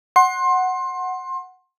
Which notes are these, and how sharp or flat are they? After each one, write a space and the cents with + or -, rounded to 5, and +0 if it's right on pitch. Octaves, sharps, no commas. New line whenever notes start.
F#5 +0 C6 +25